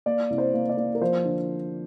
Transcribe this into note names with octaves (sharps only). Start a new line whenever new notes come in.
A#3 D5
C2
C5
A#3
D5
A#3
A#4
F3 C5
D3